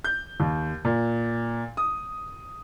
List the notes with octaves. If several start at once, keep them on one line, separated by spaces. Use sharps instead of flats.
G6
D#2
A#2
D#6